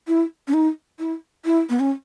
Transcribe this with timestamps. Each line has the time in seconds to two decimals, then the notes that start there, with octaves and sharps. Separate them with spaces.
0.08 E4
0.48 C#4
0.53 D#4
0.99 E4
1.45 E4
1.70 B3
1.80 C#4